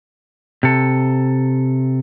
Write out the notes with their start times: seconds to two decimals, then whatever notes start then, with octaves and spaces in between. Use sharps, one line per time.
0.63 C3 A4